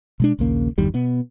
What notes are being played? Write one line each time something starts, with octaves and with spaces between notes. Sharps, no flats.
B2 G#3 D4
A#1 D#2 C#3 A#3
G1 E2 D#3 G3
B2 B3